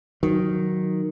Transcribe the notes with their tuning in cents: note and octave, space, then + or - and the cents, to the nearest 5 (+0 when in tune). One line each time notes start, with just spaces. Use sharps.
D#3 +0 F#3 +0